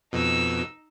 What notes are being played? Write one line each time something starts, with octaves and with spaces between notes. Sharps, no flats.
F2 B2 D#4 E6